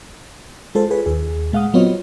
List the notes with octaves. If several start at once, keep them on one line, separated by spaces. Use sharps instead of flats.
G#3 F4 A4 C5
F4 G#4 B4 C#5
D#2 G#4
A#2 G#3 F5 F#5 D#6
F#3 B3 C4 F4 C#5 D#5